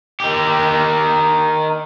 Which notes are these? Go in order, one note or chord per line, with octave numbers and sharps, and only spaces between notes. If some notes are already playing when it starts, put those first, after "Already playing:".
D#3 G4